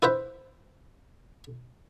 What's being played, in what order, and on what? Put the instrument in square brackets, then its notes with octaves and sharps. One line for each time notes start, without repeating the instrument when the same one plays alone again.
[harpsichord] E4 B4 C5 E5